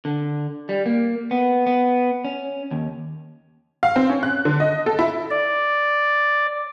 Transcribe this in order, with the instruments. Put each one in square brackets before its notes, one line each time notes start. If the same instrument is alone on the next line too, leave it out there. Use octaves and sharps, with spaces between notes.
[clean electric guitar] D3
G3
A#3
B3
B3
C#4
D#2
[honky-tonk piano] F5
C4
C#4
F#6
D3
D#5
A4
E4
[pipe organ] D5